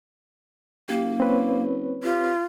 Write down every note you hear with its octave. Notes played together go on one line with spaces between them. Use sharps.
F#1 A#3 G4
C4 B4 C#5
F4 G4